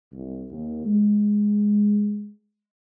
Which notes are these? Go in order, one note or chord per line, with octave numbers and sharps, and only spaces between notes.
C2
D#2
G#3